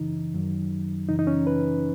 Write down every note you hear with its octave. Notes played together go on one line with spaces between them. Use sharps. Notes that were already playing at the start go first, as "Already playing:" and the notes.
Already playing: F#2 C#3 E3 D#4
F#2 D#3 F#3
F#2 C#3 E3 D#4
D#4
C#4
B4